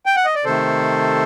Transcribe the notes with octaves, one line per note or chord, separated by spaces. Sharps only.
G5
F#5
D#5
D5
C3 D#3 A3 A4 C5